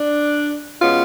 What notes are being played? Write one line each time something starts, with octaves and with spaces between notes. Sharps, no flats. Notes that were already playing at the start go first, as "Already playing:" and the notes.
Already playing: D4
B2 G#3 B3 C#4 F4